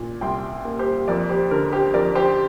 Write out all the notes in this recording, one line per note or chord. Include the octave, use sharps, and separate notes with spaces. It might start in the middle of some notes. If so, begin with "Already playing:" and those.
Already playing: A#2
C2 G5 C6
A#3
G4 C5
F2 A#4 D5
G4 C5
D3 A#4
G4 C5
F2 A#4 D5
G4 C5